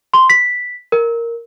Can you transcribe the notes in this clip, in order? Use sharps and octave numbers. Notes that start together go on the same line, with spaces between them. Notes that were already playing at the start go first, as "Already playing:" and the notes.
C6
B6
A#4